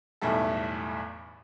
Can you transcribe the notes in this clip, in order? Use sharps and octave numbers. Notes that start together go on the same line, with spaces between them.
B1 E2 A2 G3 E4 A4